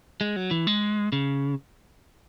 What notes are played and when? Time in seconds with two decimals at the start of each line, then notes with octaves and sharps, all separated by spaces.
0.21 G#3
0.36 F#3
0.51 E3
0.67 G#3
1.12 C#3